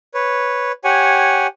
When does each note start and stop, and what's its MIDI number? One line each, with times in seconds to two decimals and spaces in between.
0.14 0.72 71
0.14 0.72 73
0.84 1.47 67
0.84 1.47 73
0.84 1.47 78
0.84 1.47 80